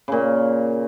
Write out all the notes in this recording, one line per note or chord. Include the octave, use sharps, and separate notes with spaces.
A#2 C#3